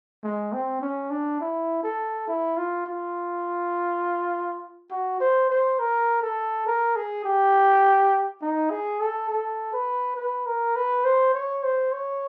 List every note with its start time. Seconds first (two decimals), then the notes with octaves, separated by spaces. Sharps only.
0.23 G#3
0.52 C4
0.81 C#4
1.10 D4
1.40 E4
1.83 A4
2.27 E4
2.57 F4
2.86 F4
4.90 F#4
5.20 C5
5.49 C5
5.79 A#4
6.22 A4
6.66 A#4
6.96 G#4
7.24 G4
8.42 D#4
8.70 G#4
9.00 A4
9.29 A4
9.73 B4
10.16 B4
10.46 A#4
10.76 B4
11.05 C5
11.34 C#5
11.63 C5
11.92 C#5